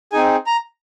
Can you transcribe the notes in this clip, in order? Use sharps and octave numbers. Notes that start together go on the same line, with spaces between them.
C4 D#4 G#4 G#5
A#5